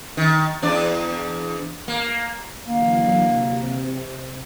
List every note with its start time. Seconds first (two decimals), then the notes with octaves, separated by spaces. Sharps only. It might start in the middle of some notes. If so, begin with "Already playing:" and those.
0.17 D#3
0.62 E2 D4 D5
1.88 A#3
2.68 D3 E3 F#3 A#3
3.23 C3